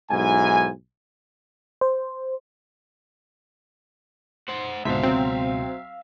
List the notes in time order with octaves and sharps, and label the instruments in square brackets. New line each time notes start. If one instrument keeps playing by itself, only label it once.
[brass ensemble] B1 G#2 E4 G#5
[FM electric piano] C5
[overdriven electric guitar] C5 F#5
[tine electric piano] C#2 B2 [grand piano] G#2 D3 C4 [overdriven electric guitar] E5 F5
[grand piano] F#3 [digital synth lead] C4